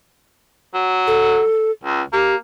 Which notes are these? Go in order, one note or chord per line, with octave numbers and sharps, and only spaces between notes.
F#3
A4
C#2
A#3 G4